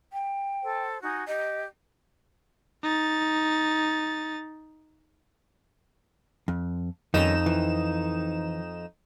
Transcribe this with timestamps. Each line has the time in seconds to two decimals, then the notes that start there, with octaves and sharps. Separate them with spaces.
0.13 G5
0.62 A4 C5
1.01 D#4 F#4 G#5
1.28 G4 D#5
2.83 D#4 A6
6.48 F2
7.14 F2 D#3 G3 C#4 D#4 E7
7.46 E3